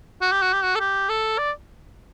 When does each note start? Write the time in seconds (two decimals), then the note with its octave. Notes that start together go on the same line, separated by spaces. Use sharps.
0.22 F#4
0.32 G4
0.42 F#4
0.53 G4
0.63 F#4
0.75 A4
0.80 G4
1.09 A4
1.38 D5